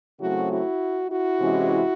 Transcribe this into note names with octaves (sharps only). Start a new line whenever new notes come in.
C#3 F#3 A3 C4 E4 F#4
E4 F#4
E4 F#4
C3 E3 G#3 C#4